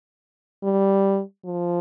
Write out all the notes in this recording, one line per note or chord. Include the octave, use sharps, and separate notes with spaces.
G3
F3